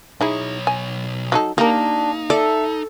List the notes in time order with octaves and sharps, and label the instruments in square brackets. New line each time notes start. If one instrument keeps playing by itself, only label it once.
[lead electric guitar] B1 C#5 [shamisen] D#4 E4 G#4
[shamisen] G#5
F#3 D#4 A4
[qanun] A#3 [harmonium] D4 [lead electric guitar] D#4 [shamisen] G4 A#4
[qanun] A4 [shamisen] D5 [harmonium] E5